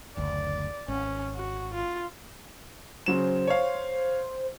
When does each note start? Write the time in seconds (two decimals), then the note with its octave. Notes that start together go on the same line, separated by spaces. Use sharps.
0.17 F#1 D2 D5
0.88 G#1 C#4
1.35 F#4
1.73 F4
3.06 C#3 F#3 C5 E7
3.47 C#5 F5